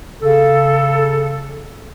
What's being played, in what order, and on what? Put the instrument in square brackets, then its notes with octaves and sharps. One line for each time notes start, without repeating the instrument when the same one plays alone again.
[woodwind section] C#3 A4